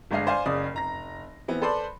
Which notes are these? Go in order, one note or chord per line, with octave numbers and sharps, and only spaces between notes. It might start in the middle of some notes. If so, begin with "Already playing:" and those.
G1 G#3 D4 D#5 F5 C7
C5 D5 F5 G#5 C6
F#1 C#3 D5 D#6
F1 A#5 A#6
E3 B3 C4
A4 B4 C5 D5 B5 C6